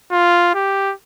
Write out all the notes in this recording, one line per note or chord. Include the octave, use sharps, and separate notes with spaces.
F4
G4